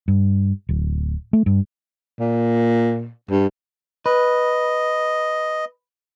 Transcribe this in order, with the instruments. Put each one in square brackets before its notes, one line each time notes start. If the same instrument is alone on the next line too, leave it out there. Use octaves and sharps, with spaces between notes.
[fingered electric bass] G2
D1
A3
G2
[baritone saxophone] A#2
G2
[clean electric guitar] B4 [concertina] D#5